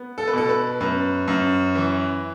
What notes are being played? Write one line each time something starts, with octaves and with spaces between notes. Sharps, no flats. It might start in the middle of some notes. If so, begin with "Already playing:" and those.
Already playing: B3
A4
B4
B2 A4
B4
F#2 B4
F#2
E3